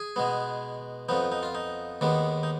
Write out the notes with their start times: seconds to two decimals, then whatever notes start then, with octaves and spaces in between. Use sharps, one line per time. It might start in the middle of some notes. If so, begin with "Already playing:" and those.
Already playing: G#4
0.16 B2 G#3 B3
1.09 F2 F3 B3 D#4
1.32 D#4
1.43 F4
1.55 D#4
2.01 D#2 D#3 G#3 B3
2.43 D#4